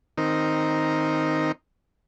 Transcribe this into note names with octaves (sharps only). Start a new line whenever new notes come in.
D#3 C4 D#4 A#4